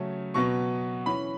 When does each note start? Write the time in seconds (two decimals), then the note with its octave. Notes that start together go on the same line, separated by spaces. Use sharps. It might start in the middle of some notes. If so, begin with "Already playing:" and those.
Already playing: C#3 F#3 A3 C#4
0.34 B2 F#3 B3 C#6
1.06 E3 C#4 B5